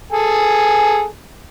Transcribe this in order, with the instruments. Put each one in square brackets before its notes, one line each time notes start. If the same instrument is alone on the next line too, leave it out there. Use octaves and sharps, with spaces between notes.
[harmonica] G#4 A4 G#5